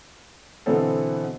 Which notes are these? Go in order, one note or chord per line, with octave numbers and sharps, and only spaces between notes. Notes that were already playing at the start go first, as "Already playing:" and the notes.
B2 D3 E3 B3 C4 A4